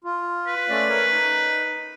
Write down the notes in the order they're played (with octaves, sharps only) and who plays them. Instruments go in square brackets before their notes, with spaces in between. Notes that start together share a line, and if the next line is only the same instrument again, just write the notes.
[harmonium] F4
[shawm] B4
[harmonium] A3 C#4 D5
A#4 C#5
D#4